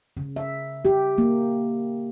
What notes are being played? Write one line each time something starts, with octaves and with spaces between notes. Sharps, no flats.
C#3
E5
G4
A#3